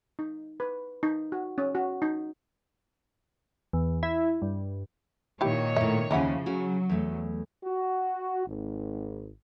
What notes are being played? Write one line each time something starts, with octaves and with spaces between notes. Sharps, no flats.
D#4
B4
D#4
F#4
C#4
F#4
D#4
E2
E4
G2
A#2 D#3 E4 G4 C#5
A2 A#3 E5
D#2 C#3 E3 F3 C#4 E4 F#5
C#3 F#3 F#4
E2 A3
F#4
G#1